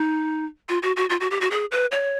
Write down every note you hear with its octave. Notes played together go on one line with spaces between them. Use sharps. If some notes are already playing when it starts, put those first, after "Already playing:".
Already playing: D#4
F4
F#4
F#4
F4
F#4
G4
F#4
G#4
B4
C#5